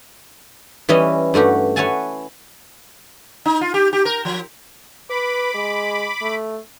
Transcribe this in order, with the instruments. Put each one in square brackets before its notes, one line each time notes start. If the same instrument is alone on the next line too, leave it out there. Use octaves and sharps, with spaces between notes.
[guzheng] E3 G3 C#4 E4 D#5
G2 A3 F#4 G4
B4 C#5 E5 F#5 G#5 A5
[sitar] D#4
F4
G4
G4
A#4
F3
[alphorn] B4 [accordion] B5 D6
[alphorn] G#3
A3